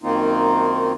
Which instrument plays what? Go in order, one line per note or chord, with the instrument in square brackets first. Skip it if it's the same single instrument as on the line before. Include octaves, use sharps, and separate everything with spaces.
[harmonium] F#2 D#3 A#3 C4 D#4 F4